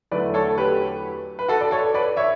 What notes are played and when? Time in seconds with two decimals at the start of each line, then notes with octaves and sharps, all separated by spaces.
0.11 E2 D3 F#3 A3 B4 D5
0.34 A4 C#5
0.58 G4 B4
1.39 B4
1.48 F#4 A4
1.61 D5
1.71 A4 C#5
1.94 B4 D5
2.17 C#5 E5